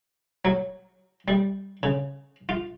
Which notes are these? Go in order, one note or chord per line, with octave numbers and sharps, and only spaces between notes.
F#3
G3
C#3
F4